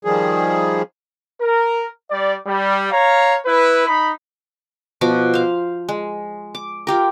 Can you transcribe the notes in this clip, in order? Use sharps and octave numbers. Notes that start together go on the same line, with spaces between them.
D#3 F3 G3 G#4
A#4
G3 D5
G3
C#5 F5 A#5
E4 B4
D#4 B5
B2 F3 F#4 D6
C5 F5
G#3
D6
F4 G4 A#4